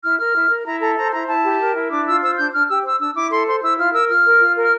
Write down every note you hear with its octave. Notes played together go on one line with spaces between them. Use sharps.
E4 F6
A#4 F6
E4
A#4
E4 A#5
A4 A#5
C5 A#5
E4 A#5
E4 A5
G4
A#4
E4
D4 D6
F4 E6
C5 E6
D4 G6
D4 F6
G4 E6
C5 E6
D4 E6
E4 D6
A4 C6
C5 C6
E4 E6
F4 F6
A#4 E6
F4 F6
A#4
F4
A#4
F6